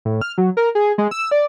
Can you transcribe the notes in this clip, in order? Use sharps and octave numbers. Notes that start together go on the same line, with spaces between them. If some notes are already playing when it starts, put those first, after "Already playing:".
A2
F6
F#3
A#4
G#4
G#3
E6
D5